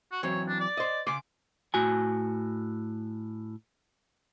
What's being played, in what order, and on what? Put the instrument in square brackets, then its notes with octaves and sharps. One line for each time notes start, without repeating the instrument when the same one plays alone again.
[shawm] F#4
[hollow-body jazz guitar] E3 F#3 C4 [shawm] C#5
[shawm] D4
D5
[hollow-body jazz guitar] C5 D#5
[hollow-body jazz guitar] C#3 G#5 C6 [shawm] D6
[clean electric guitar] A2 F#4 G#5